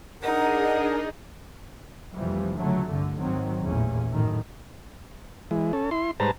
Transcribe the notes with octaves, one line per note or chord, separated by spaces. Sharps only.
D4 D#4 G#4 A#4 D#5 F#5
F1 E3 F3 G3
C#2 D3 F#3 A3
C2 G2 D3
G#1 D#3 F#3 C4
A1 E2 A#2 C#4
F#2 A2 D#3
E3 G#3
C#4 A4
E4 C6
G#2 G3 B4 C5 A5 A#5